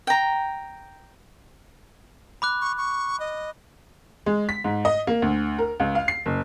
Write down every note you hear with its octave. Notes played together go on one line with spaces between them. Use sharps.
G5 A#5
B5 D6 F#6
C#6
C#6
D#5
G#3
B6
G#2
D#5
A#3
D2
A#4
C#2
F5
C7
F#1